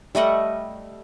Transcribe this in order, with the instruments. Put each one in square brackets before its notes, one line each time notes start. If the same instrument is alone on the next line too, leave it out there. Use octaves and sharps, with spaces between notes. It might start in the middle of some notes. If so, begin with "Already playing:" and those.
[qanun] G3 A3 D#5 F#5